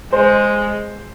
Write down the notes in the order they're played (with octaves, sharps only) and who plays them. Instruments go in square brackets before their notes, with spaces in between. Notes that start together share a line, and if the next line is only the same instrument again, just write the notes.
[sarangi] G#3 [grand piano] C5